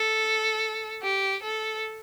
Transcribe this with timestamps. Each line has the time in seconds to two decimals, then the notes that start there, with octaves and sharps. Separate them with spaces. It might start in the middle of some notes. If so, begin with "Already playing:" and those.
Already playing: A4
1.02 G4
1.43 A4